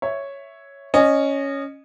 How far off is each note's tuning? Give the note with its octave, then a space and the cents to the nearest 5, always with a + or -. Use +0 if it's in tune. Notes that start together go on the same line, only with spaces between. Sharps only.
C#5 +0 E5 +0
C#4 +0 D#5 -20